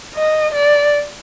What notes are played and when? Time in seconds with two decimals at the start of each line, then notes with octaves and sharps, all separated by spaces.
0.15 D#5
0.55 D5